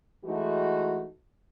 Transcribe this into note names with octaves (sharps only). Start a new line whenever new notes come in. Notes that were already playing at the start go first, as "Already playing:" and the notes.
E3 G#3 A3 D#4 F#4